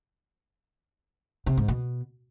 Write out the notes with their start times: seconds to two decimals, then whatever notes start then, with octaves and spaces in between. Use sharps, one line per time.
1.46 C3
1.57 G#2
1.68 B2